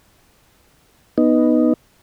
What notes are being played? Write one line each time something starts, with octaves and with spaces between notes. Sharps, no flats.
B3 D#4